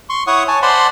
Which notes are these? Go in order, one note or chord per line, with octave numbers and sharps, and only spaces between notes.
C6 C#6
E4 C#5 F#5 C#6 D#6
C#5 G#5 A5
C5 D5 F#5 A5 B5 C6